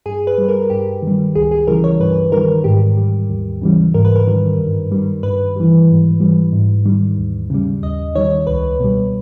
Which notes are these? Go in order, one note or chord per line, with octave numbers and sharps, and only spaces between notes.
G2 G#4
B4
G3
A#4
G2 G4
D#3 G3
C#2 G#4
G#4
C#3 E3 G3 A#4
C#5
G2 B4
D#3 G3 A#4
G#2 G4
G3
D#2
C#3 E3 G3
G#2 A#4
B4
A#4
D#3 G3
G2
D#3 G3
G2 B4
E3 G3
G#2
E3 G3
G#2
D#3 G3
D#2
C#3 G3
D#2 D#5
D#3 G3 C#5
C#2 B4
B2 G3